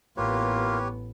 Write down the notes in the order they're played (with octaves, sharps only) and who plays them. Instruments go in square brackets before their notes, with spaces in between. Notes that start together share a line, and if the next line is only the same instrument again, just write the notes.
[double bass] A1 B3 [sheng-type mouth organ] A#3 F4 [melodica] G4 B4 C#5